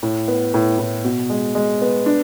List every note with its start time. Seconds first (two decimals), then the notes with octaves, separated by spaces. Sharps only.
0.03 A2
0.28 B3
0.54 A2
0.79 A2
1.04 B2
1.30 G#3
1.55 G#3
1.82 B3
2.06 D4